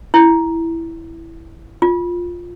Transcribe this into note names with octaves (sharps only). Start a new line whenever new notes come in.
E4
F4